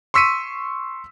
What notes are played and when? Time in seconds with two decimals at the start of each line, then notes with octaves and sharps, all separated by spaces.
0.14 C6 C#6 E6 B6 C#7 D#7